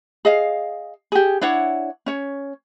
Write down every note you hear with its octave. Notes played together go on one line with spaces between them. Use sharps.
G#4 D#5 F5
G4 G#4
D4 E4 C#5 F#5
C#4 C#5